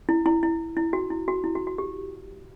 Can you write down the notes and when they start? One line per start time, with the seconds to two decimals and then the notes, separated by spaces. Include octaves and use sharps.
0.09 E4
0.26 E4
0.43 E4
0.77 E4
0.93 F#4
1.10 E4
1.28 F#4
1.44 E4
1.55 F#4
1.67 F#4
1.78 G4